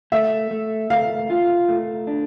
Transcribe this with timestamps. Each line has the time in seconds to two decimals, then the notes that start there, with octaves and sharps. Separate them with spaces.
0.12 A3 E5
0.51 A3
0.90 A3 F5
1.30 F4
1.68 A3
2.07 D4